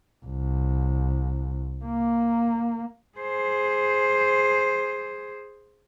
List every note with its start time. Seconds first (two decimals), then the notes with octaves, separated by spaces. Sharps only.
0.25 C2
1.85 A#3
3.18 G#4 C5